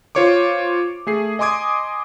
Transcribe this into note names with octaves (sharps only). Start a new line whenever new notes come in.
F4 C5 C#5 C#6 D6
A3 G#4 C7
D#5 G#5 C6 D6 D#6 G#6